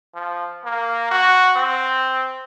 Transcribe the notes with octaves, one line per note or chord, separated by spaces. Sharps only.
F3
A#3
F#4
C4